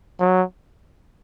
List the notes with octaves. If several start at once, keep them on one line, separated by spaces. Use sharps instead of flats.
F#3